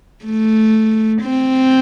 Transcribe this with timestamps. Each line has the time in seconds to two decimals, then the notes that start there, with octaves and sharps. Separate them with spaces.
0.25 A3
1.22 C4